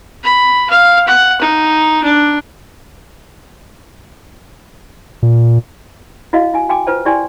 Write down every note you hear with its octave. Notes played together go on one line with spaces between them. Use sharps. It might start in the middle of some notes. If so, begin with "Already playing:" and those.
B5
F5
F#5
D#4
D4
A#2
E4 F#4 D#5 F5
E4 G#5
F#4 G5 G#5 D6
F4 B4 C5 A5
E4 G4 D5 G5 G#5 C6